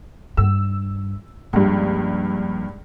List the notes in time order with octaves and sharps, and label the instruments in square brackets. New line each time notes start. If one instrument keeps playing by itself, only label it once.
[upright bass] G2 G3 [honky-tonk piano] E6
[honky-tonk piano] C#2 G2 [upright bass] F3 A#3